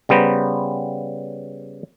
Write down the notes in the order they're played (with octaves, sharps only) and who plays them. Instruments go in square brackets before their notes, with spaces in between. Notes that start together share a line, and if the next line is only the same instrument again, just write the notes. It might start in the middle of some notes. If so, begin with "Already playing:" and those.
[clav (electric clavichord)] C#3 G3 B3 C5 A#5